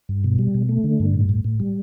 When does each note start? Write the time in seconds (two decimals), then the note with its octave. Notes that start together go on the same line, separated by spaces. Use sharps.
0.09 G2
0.24 B2
0.39 G3
0.54 B2
0.69 A3
0.84 D3
1.00 G2
1.14 A2
1.29 A2
1.45 A2
1.60 G3